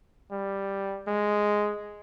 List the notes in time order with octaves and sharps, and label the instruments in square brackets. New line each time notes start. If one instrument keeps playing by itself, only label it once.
[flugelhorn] G3
G#3